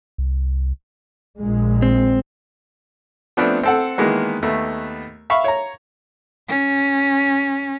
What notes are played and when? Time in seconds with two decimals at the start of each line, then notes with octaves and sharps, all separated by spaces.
0.18 C2
1.39 A#1 A#2 G#3
1.82 C4
3.37 F3 A3 B3 C4 D4
3.63 C4 A4 F#5
3.98 D#3 E3 G#3 A#3 B3
4.42 D#2 A3 B3
5.30 E5 F5 B5 C#6
5.44 C#5 A#5
6.48 C#4